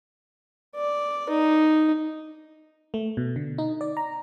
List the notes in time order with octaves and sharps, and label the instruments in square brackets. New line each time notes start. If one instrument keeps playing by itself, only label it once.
[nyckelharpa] D5
D#4
[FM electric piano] A3
B2
D3
D#4
D5
A#5